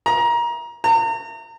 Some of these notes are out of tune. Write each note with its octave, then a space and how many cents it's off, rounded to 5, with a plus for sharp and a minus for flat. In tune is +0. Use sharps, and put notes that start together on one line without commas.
A#5 +25
A#5 -35